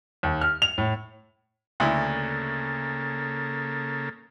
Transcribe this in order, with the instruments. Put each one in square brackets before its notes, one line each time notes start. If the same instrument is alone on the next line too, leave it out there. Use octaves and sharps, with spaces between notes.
[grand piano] D#2
F6
F7
A2
[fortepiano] D2 E4 [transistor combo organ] C#3 A#3 A4